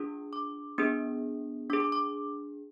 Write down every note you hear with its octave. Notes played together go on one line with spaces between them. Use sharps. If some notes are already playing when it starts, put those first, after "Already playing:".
Already playing: D4 F4 G#4 D#6
D6
B3 D4 G#4 D#6
D4 G#4 D6
D6
D6